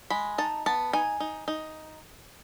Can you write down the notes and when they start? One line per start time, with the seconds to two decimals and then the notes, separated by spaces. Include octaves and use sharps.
0.10 G#3 B5
0.38 D#4 A5
0.66 B3 A5
0.93 D#4 G#5
1.20 D#4
1.48 D#4